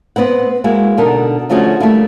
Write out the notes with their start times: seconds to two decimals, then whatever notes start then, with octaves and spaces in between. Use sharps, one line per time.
0.16 B3 C4 B4 F#5
0.64 G#3 A#3 E4 F#4
0.97 B2 D3 D#4 A4 A#4
1.49 D3 F3 A3 C#4 F#4 G#4
1.80 G3 A3 A#3 D4 E4 F4